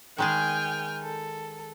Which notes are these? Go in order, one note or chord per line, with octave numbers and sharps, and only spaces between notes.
D#3 G#3 G#4 G5 G#5 F6
A4